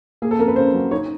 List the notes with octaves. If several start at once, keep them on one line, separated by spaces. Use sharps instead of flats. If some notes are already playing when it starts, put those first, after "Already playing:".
A#3 G#4
A4
F2 A#4
B4
C#3 C5
F#3
D#4 C#5